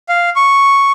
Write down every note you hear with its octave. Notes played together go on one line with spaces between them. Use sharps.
F5
C#6